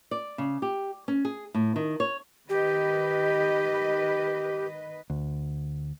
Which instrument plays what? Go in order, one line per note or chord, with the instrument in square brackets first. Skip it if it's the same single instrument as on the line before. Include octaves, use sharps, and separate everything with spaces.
[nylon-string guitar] D5
C#3
G4
C#4
G#4
A2
D#3
C#5
[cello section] D#3 B4 D#5 [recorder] G4
[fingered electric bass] D2